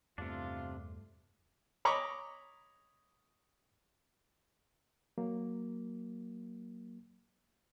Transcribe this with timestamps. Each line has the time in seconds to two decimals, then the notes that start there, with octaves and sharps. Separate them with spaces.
0.18 E2 G2 C3 A3 D4 F4
1.85 C#5 D#5 A#5 B5 C#6 D6
5.18 F#3 A#3